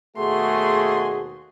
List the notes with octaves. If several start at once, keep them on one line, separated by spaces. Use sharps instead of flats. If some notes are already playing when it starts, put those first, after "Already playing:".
D#2 B2 A3 F#4 G#4 C6